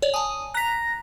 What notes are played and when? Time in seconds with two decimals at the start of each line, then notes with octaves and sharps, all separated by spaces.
0.02 C#5 D5
0.14 G#5 A5 D#6
0.54 A#5 F#6 B6